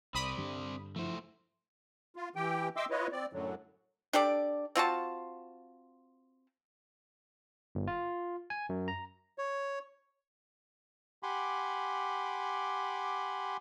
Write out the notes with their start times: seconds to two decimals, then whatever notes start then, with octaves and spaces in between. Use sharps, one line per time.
0.15 C2 C4 D5 B5 D#6
0.37 G2 D3 G3
0.96 F3 A3 E4 C5
2.16 F4
2.36 E3 G4 G5
2.76 D#5 E5 G5 C6 D6 E6
2.90 E4 F4 B4 C#5 D#5
3.12 C4 D5
3.33 F#2 A2 D3 F#3
4.13 D4 G4 A4 D5
4.75 C4 F4 F#4 A5
7.75 G1
7.87 F4
8.50 G#5
8.69 F#2
8.88 A#5
9.38 C#5
11.23 G4 F#5 G#5 B5 C6 D6